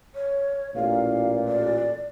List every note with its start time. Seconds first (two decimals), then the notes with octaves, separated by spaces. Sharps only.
0.15 C#5
0.75 A1 A#2 F5
1.48 D5